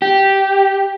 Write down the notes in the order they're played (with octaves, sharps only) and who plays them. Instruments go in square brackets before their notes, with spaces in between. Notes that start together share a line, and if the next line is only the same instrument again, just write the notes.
[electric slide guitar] G4